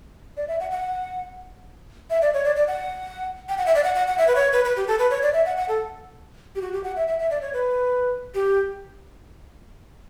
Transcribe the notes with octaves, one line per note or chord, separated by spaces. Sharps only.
D5
E5
F#5
F#5
E5
D5
C#5
D5
D5
F#5
G5
F#5
E5
D5
F#5
F#5
F#5
E5
B4
C#5
B4
B4
G4
A4
B4
C#5
D5
E5
F#5
F#5
A4
G4
F#4
G4
F#5
E5
E5
E5
D5
C#5
B4
G4